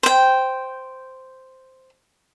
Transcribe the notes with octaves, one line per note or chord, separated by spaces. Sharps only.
C5 G5